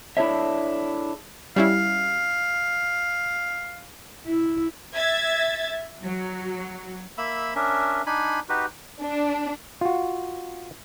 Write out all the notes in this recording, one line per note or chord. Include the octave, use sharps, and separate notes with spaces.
D4 E4 G#4 A4 C#5 E5
G3 C#4 E4 F5
E4
E5 G#6 A6
F#3
A#3 E5 B5 E6
C#4 D4 A#4 E5
D4 D#4 G#5 B5
D#4 F#4 G4 B4
D4
F4 F#4